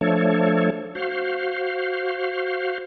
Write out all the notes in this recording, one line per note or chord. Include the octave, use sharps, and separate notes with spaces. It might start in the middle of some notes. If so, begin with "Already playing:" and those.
F3 A3 D4 A4 C#5
F#4 C5 F5